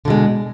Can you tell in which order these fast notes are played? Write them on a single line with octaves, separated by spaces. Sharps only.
D3 B2 G#3